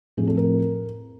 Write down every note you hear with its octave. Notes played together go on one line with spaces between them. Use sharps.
A2 F3 A3 C4 G#4
A4
A#4